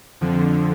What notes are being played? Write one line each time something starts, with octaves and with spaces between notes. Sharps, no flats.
F2 D3 F3